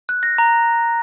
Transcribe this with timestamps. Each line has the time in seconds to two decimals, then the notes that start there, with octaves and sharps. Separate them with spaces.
0.09 F#6
0.23 A#6
0.38 A#5